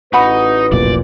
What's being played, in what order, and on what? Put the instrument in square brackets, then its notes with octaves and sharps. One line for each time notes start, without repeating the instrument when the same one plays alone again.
[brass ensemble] A1 B4 [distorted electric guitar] D#4 D#5 [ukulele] F#4 F#5 B5
[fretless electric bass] F1 B1 A#2 [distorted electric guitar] D5